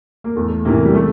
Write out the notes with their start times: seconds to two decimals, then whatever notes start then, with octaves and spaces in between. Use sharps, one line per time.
0.24 A#3
0.36 E2 A3
0.65 C3 E3 A#3
0.85 G3
0.95 A3